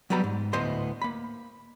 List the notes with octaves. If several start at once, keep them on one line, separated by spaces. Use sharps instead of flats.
F#3 G3 B3 G4 A#5 B5
G#2
D2 A2 B3 C5 D#5 C6
A#3 B5